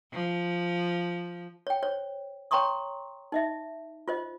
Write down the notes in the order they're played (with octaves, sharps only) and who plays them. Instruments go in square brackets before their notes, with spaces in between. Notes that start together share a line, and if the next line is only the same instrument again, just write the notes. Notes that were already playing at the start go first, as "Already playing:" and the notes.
[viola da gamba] F3
[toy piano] C#5 G5
C5 C#5
C#5 G5 A#5 C6 C#6 D#6
D#4 D#5 E5
F4 C5 D#5